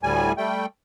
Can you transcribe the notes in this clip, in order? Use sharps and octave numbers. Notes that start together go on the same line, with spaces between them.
D2 A2 G3 G#5
G3 A3 G5